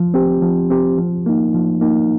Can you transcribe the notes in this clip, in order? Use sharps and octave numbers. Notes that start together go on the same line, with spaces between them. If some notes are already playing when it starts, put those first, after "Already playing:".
Already playing: F3
C4 G4
F3
C4 G4
F3
A#3 D#4
F3
A#3 D#4